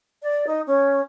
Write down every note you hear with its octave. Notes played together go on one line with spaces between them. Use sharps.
D5
D#4
C#4